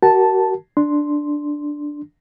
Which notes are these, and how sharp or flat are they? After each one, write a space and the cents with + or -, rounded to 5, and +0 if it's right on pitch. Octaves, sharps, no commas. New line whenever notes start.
F#4 +35 A#4 +0 A5 +0
D4 +0 C6 +0